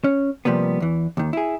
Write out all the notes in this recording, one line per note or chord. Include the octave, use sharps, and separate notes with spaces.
C#4
C3 F3 G3 A#3 B3
E2 E3
D#2 D#3
E4 G#4